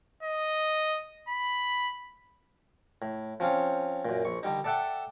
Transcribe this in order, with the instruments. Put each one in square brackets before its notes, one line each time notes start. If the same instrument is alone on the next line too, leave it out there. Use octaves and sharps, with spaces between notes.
[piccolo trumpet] D#5
B5
[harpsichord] A2
F3 C4 C#4 F4 C#5
F#2 A#2
A#1 C#6
D3 G3 D#4
A4 D5 E5 F#5 G5 A5